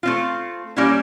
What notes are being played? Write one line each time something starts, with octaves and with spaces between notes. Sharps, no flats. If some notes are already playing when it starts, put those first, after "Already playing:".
A3 C4 F4
G3 A#3 C#4 E4